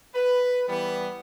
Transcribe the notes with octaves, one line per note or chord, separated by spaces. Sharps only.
B4
E3 G3 B3